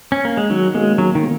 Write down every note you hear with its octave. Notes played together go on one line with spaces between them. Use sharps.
C#4
A#3
G#3
D#3 F#3
G#3 A#3 C#4 F#4
D#3 F#3
D#3
A#3